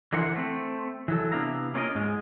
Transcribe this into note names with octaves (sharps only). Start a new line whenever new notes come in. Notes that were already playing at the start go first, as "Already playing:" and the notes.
D3 E3 A#4 C5 F#5
A3 C4
E3 F#3 A4
C3 B3 D4 E4 F5 A#5
A#3 C#4 F4 G#4 A#4 D#5
G#2 G#3